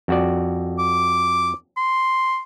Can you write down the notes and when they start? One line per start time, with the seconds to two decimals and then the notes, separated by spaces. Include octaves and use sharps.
0.08 F2 F#4 D5
0.78 D6
1.77 C6